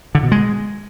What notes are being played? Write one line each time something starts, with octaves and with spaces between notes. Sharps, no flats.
D3
B2
G#3